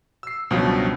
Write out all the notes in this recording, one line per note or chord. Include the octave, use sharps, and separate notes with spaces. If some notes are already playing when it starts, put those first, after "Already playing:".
E6 C7
C#2 G2 B2 F3 F#3